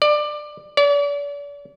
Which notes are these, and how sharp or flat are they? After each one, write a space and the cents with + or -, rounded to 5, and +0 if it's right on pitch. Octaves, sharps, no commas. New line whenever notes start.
D5 +20
D5 -40